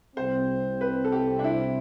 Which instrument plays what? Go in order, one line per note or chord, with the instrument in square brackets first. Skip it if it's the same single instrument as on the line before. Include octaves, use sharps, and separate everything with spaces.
[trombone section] C2 C3 G3 C4 [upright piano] C5
[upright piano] B4
A4
G4
D4
E4